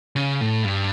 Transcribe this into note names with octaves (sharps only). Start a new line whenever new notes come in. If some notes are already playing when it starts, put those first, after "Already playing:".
C#3
A2
G2